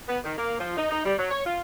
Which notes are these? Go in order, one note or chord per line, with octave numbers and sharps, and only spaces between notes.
B3
D#3
A#3
F3
D#4
D#4
G3
F#3
C#5
F4